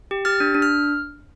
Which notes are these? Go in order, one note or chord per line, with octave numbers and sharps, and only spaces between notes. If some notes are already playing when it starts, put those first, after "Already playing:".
G4
G4 F6 A6
D4
D4
F6